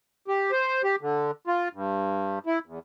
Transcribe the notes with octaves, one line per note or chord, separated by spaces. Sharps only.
G4
C5
G4
D3
F4
G2
E4
E2